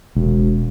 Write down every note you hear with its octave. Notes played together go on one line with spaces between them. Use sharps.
E1